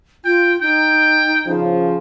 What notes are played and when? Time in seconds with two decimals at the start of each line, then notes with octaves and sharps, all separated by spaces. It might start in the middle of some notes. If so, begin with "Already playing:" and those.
0.25 F4 G5
0.61 D#4 G5
1.47 C#3 F3